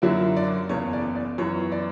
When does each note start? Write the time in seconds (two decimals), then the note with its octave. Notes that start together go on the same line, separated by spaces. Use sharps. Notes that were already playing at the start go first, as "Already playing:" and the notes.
0.02 F#2 D3 F#3 A#3 E4 E5
0.37 D5
0.69 F#1 E2 C#3 C#5
0.93 D5
1.15 D5
1.38 F#2 E3 B3 C#5
1.72 D5